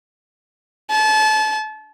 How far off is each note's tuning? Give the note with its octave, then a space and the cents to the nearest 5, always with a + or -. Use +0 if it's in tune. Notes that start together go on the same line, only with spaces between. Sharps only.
A5 -30